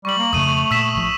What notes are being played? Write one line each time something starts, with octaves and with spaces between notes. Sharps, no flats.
G3 C#6 F#7
A#3
F2 C#3 A3 D#6 D#7
F7
A#2 E6 B6 E7
A1 F3